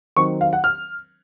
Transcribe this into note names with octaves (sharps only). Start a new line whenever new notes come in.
D#3 F#3 C4 C#6
F5
F#5
F6